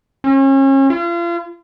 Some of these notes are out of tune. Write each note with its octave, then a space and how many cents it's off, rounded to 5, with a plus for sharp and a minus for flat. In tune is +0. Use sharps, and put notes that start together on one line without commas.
C#4 -35
F4 -35